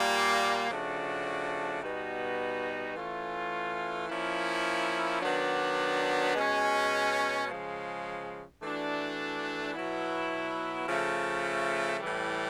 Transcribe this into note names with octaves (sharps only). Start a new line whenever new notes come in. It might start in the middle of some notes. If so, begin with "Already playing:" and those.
Already playing: A#2 G3 A#3
C#3 F3 A3 D4 F#4
B2 G3 B3 D#4 F#4
E3 A3 C#4 F4
F3 A#3 C#4 E4
D#3 F#3 B3 D4
B2 G#3 C#4
C#3 F3 G#3
E3 A3 D4 F#4
B2 F#3 B3 E4
C#3 F3 A3
A2 E3 G3